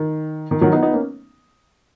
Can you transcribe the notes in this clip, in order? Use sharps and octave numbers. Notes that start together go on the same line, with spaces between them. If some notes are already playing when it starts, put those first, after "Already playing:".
Already playing: D#3
D#3
D#3 F#3
B3 D#4
B3 D#4
A#3 C#4